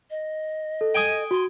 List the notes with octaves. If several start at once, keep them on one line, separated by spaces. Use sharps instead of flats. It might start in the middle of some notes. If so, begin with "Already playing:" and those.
D#5
A4
G5 G#5 D#6
F#4 C6